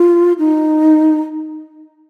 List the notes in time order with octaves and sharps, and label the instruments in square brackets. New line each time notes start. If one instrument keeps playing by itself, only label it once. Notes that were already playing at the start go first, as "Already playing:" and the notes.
Already playing: [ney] F4
D#4